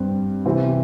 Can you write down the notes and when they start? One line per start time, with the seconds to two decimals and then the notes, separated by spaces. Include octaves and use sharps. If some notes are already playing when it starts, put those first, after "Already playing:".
Already playing: G2 G3 C4
0.45 C3 E3 C4 E4